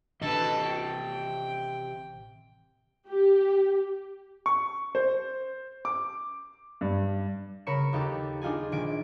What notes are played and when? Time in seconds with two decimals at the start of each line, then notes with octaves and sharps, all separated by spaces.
0.21 A1 C3 D#3 D4 A4 B4 D#5 A5
0.65 G5
3.08 G4
4.46 C#6
4.95 C5
5.85 D6
6.81 G2
7.66 C#3 A#4 C#5 B5 C#7 E7
7.93 D#2 D#4 G4 A4
8.42 D4 D#4 F4 G#4 G#5
8.72 A#1 D#3 G#5 D7